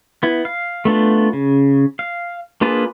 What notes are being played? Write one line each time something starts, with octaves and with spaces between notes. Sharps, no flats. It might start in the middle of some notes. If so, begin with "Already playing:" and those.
B3 E4
F5
A3 B3 D4 F4
C#3
F5
A#3 D4 F4 G#4 B4